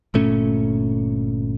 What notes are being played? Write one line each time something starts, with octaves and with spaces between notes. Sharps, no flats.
G1 A#2 A3 C#4